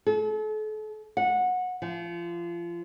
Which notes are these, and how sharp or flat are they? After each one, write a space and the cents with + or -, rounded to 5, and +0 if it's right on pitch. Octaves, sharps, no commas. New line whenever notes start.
A4 -40
F#5 -20
F3 -30